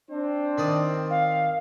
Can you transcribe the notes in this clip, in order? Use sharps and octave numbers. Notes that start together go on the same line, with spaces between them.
C4 D4 C5
D#3 D5 D#6
F5